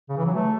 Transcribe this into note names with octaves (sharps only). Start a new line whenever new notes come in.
C#3
E3
F#3
A3